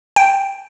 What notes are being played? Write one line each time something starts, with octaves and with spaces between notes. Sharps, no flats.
G5